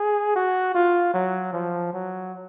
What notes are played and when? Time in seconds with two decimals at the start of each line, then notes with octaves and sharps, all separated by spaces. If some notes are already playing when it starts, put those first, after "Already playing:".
Already playing: G#4
0.36 F#4
0.74 F4
1.14 F#3
1.53 F3
1.93 F#3